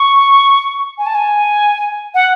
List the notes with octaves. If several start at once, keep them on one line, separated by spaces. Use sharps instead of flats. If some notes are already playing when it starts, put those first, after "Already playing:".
Already playing: C#6
G#5
A5
G#5
F#5